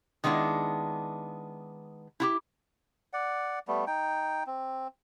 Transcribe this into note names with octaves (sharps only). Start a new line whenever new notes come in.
D#3 G#3 B3 D4 E4
E4 F4 G4
D5 F#5
G3 A3 B3
D#4 G5
C4